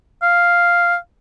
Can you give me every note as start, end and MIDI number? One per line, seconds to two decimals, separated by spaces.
0.22 0.95 77